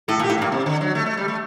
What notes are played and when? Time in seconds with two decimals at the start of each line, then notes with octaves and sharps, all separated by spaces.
0.08 A2 A4
0.20 A#2
0.23 G4
0.30 A2
0.38 G2 A#3
0.52 C3
0.66 D3
0.81 F#3
0.95 A3
1.06 A3
1.17 G3
1.28 A3